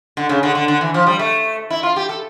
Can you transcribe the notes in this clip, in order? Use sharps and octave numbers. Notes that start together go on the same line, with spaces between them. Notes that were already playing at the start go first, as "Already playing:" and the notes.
D3
C#3
D3
D3
D3
E3
F3
G3
A3
E4
F4
G4
A4